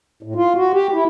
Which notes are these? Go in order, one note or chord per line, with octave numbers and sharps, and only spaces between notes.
A2
F4
F#4
G4
E4